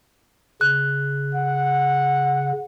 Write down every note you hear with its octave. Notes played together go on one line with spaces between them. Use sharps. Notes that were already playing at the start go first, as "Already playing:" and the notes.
C#3 F#6
F#5